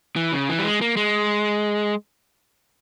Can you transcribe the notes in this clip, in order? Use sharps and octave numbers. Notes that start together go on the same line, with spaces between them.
E3
C#3
E3
G3
G#3
A#3
G#3